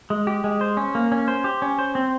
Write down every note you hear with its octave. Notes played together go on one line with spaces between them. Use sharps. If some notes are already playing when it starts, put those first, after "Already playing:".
G#3
G4
G#3
C5
C#4
A#3
C#4
C5
G4
C#4
C5
C4